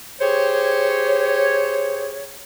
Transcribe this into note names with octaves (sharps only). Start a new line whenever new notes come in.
G4 G#4 C5 C#5